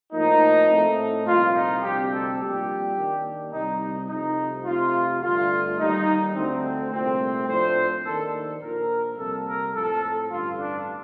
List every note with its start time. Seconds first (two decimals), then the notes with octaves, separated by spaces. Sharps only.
0.13 A2 F3 A#3 D#4
0.69 A2 A3 C4
1.26 C2 A#2 F3 F4
1.54 D#4
1.82 D2 C3 G3 C4 G4
2.11 A4
2.39 A#1 A#2 G3 D4 G4
2.96 D#2 D#3 A#3 D4
3.52 C2 C3 G3 D#4
3.80 D#4
4.08 C2 C3 F3 A3 D#4
4.65 F2 C3 F3 A3 F4
5.21 G2 D3 A3 D4 F4
5.78 D#2 D#3 G3 D#4
6.34 D2 D3 A3 C4
6.91 C2 A#2 A3 C4
7.47 A2 F3 A3 D4 C5
8.04 D#2 D#3 A#3 D4 A4
8.61 A#1 A#2 F3 A#3 A#4
9.17 F2 C3 G3 A#3 A4
9.45 A#4
9.73 A2 F3 C4 A4
10.30 A1 G2 D3 F4
10.58 D4